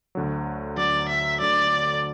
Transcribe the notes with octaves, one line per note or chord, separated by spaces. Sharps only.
D2 D3 F#3
D2 D3 F#3 D5
E5
D2 D3 F#3 D5